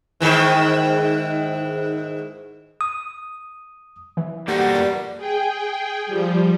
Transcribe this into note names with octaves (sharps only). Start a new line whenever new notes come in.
G#2 D#3 E3
D#6
E3
G3 A#3 C4 F#4 A4 D5 F#5
F2 A#4 B4
G#4 G5
F3 G3